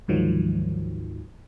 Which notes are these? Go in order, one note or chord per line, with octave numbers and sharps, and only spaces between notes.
D2 G#2 D#3 F3 F#3